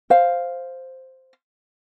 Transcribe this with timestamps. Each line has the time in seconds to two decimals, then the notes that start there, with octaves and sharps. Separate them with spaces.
0.10 C5 F5